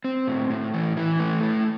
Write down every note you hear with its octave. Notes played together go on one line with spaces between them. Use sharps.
C4
A2
A2
E3
E3
A3
A2